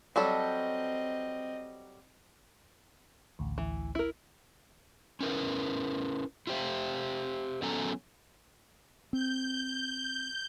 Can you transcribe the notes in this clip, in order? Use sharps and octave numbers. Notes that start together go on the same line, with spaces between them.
F#3 G3 C4 A4 D#5
A1 D2
E3
E4 A#4
C#4 E4 A#4 B4
E4 F4 G4 C5 E5 F5
F#3 B3 C#4 A4 G#5 A#5
C4 G6